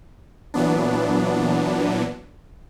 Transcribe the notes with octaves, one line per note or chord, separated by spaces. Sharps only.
A#2 E3 F#3 B3 D4